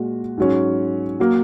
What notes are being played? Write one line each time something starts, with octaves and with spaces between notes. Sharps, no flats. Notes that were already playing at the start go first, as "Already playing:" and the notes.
Already playing: A#2 G#3 F#4
G#2 F#3 C#4
F#3 A#3